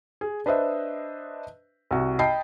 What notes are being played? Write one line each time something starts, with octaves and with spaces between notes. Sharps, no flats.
G#4
D4 B4 C5 D#5 E5
C2 F#4
D#5 G5 A5 B5 C7